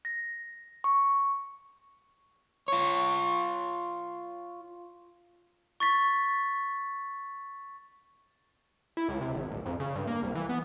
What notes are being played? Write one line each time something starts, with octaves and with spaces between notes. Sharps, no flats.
A#6
C#6
F4 C#5
C#6 A6 B6
E4
C#2
C3
G#1
D1
F2
C#3
G2
A#3
C2
E3
B3